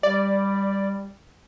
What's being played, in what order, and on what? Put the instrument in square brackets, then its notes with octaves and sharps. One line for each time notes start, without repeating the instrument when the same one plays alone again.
[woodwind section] G3 [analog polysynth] D5